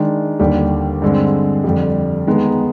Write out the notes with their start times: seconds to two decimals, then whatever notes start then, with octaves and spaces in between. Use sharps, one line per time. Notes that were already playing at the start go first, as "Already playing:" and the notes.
Already playing: D#3 G#3 D4
0.39 D#2 D3 G3
1.02 G2 D3 G#3 C4
1.64 F2 D3 G3
2.27 D#3 G#3 B3 D#4